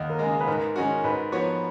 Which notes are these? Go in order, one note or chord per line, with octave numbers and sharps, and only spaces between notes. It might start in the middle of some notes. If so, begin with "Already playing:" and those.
Already playing: D#2 D#5 F#5
A#4
C#3 G#3
G#4
B4
G#2 A#4
D#3 G#3 C#4 F#4
G#2 B4
F3 B3 F#4 C#5